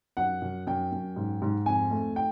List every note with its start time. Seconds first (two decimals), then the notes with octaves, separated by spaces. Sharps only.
0.17 F#2 F#5
0.42 F#2
0.67 F#2 G5
0.92 F#2
1.16 G#2
1.42 G#2
1.66 F2 G#5
1.91 A3
2.16 G5